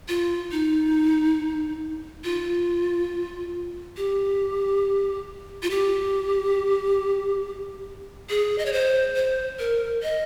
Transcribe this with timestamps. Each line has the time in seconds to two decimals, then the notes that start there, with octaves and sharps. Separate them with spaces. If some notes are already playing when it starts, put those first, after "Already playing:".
0.08 F4
0.52 D#4
2.24 F4
3.97 G4
5.63 F4
5.70 G4
8.30 G#4
8.58 D#5
8.66 C#5
8.73 C5
9.16 C5
9.59 A#4
10.03 D#5